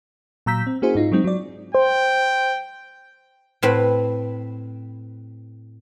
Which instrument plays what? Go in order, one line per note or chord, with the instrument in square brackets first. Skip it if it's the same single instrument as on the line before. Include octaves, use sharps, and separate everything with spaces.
[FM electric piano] A#2 F#3 A#5 E6 G6 B6
C4
A#3 C#4 E4 F#4 G#4 C5
G#2 D#4 F4
F#3 G#3 C4 D#4
F#3 D5
[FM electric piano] C5 [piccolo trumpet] G5
[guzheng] A2 C4 B4 B5